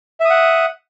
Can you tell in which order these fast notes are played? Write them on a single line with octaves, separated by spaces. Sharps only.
E5 D#6 F#5